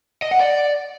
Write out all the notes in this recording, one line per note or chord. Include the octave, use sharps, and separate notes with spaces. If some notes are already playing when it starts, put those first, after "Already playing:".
D#5
F#5
D5